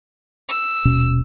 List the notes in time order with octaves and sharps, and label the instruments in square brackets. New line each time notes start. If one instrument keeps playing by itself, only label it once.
[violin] E6
[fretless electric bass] D#1 B2 C#4